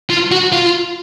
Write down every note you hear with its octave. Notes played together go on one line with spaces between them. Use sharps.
F4
F#4
F4